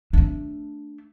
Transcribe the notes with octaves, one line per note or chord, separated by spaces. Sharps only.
A3 D4